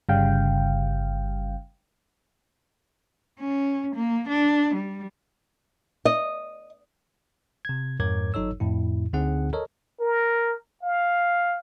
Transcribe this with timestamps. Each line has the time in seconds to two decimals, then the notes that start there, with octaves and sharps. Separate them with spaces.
0.09 G1 C#3 G3 F5 G5
3.39 C#4
3.96 A#3
4.29 D4
4.75 G3
6.05 D#5
7.65 C3 G#6
8.00 F2 G#2 A#4 C#5 D6 G#6
8.34 G1 F#3 D#4 A4 C#5 E6
8.60 F2 A2 E4
9.13 D2 D3 C4 D#4 G#4 F#5
9.53 A4 A#4 C#5 D#5
10.00 A#4
10.83 F5